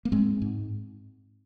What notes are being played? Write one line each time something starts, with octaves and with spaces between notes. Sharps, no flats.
A#3
G#2 G#3 C4
G#2